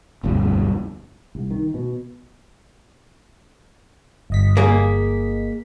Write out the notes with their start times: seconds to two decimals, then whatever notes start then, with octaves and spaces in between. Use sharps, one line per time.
0.23 F1 D2 G2 B2
1.35 C2
1.51 D#3
1.74 B2
4.30 G1 D#5 B6
4.57 A#3 G#4